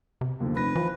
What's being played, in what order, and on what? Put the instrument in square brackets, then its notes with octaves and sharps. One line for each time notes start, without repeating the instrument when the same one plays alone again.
[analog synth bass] C3
[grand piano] D#2 D3 F3
[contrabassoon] F1 [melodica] B4 [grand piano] B5 A#6
[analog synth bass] E3 [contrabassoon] F3